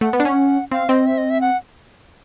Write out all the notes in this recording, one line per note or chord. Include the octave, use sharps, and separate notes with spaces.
A3 F#5
B3
D4
C#4
C4 F5
C4 D#5
E5
D#5
E5
F#5